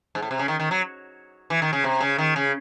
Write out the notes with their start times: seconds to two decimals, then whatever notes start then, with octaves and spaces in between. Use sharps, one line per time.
0.15 G#2
0.22 A2
0.31 C3
0.39 C#3
0.48 D#3
0.60 D#3
0.71 F#3
1.50 E3
1.62 D#3
1.73 C#3
1.84 C3
2.01 C#3
2.18 D#3
2.36 C#3